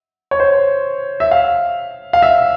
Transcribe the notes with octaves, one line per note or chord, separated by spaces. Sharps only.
C#5
C5
E5
F5
F5
E5